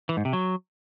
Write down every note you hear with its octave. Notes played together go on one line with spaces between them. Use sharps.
E3
G#2
C3
F#3